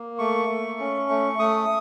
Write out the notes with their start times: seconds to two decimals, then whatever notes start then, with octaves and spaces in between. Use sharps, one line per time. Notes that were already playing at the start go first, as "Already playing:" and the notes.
Already playing: A#3
0.19 A3 C#6
0.48 A3
0.80 C#4
1.09 A3
1.39 A3 D#6